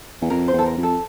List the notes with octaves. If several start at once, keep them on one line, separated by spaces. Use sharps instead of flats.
E2
F2 A#4
C5
E2
A4
A#4
F2
A4